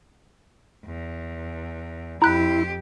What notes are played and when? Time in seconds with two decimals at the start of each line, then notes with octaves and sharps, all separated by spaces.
0.85 E2
2.22 F2 E4 G4 A#5 F#6